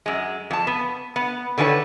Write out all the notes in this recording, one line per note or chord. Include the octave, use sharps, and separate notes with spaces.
F#2 G#3
F2 A5
B3
B3
D3 D#3 F#3 G#4 B4 C#5